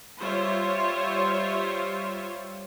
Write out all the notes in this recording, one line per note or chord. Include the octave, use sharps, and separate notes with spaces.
G3 F4 C5 C#5 E5